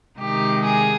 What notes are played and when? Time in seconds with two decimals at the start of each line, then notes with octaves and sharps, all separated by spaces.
0.20 C3 D#3 G#3 D#4 G4
0.65 G#4